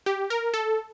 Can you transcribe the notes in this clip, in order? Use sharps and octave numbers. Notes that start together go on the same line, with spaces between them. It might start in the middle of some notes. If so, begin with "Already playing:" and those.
G4
A#4
A4